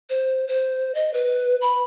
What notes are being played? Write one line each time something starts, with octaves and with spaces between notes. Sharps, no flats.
C5
C5
D#5
B4
B5